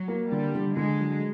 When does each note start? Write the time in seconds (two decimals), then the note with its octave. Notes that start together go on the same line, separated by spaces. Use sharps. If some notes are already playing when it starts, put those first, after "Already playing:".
Already playing: F#3
0.08 A#3
0.31 D3 G3
0.55 D3
0.77 D3 G#3
1.00 F#3